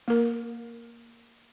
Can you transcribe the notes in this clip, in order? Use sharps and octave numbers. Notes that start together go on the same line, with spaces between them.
A#3 A#4